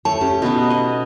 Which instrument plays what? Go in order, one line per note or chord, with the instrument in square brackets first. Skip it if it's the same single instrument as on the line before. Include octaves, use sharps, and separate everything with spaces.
[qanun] A3 [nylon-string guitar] C#5 [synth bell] A5
[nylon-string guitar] C#4 G4
[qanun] B2 B3 D#4
D#5